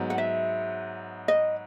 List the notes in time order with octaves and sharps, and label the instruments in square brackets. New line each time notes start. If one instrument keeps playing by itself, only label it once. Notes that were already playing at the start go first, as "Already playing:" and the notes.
Already playing: [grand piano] G#2 F#3 B3
[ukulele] F#5
E5
D#5